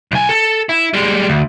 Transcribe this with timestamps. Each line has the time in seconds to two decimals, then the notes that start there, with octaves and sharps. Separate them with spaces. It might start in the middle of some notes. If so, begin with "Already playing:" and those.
0.12 B1 G#5
0.29 A4 A5
0.69 E4
0.94 G3 G#3
1.29 D2